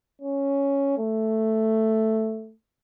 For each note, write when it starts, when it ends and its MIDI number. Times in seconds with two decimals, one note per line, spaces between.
0.22 0.94 61
0.98 2.53 57